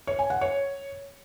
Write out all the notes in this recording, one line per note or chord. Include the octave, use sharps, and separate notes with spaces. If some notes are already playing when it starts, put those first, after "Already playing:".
C#5
G#5
F#5
C#5